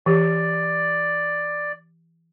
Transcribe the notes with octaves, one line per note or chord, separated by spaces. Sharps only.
E3 G4 D5